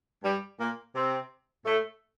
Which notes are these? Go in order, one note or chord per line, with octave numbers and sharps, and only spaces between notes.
G2 G3
A#2 A#3
C3 C4
A2 A3